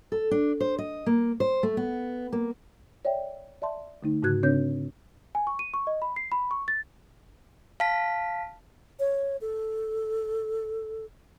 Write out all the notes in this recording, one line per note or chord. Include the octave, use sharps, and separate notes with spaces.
A4
D4
C5
D#5
A#3
C5
A3
B3
A#3
C#5 D5 E5 G5
D5 E5 A5 C6
D3 A3 D#4
G#2 C#3 F#4 F#6 G#6
C#3 C4 D4 C#5 G6
G#5
C#6
D#7
C#6
D#5
B5
C7
B5
C#6
A6
F5 A5 B6
C#5
A4